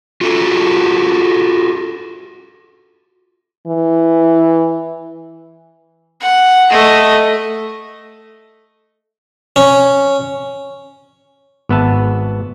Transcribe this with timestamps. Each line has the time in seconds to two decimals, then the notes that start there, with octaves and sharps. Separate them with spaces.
0.21 F4 F#4 A4
3.67 E3
6.21 F#5
6.70 A3 D#5
9.56 C#4
11.69 G#1 B3 E5 A5